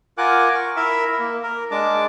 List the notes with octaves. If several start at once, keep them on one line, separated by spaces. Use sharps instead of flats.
F4 A#4 F#5 G#5 D6 F#6
C#6
E4 A#4 E5 B5 E6
A#3
A#4
G#3 D4 A5 D6